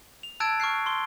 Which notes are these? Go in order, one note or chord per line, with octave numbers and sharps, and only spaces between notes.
F7
A5 E6 F#6 G#6 A6 D7
C#6 F6 F#6 C7
C6 G7